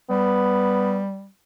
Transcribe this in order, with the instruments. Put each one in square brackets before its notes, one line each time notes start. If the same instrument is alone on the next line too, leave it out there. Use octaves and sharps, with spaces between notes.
[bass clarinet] G3 [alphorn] B3